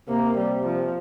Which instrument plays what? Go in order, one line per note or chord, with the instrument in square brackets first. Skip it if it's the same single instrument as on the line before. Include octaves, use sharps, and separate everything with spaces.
[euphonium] C3 [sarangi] A#3
[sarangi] G3
F3